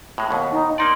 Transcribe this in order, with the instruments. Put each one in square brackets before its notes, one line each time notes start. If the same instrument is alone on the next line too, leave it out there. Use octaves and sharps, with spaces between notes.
[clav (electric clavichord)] A2 G#3
D#2 B2
[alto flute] D#4
[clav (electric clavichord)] A#3 D#4 D5 [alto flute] C6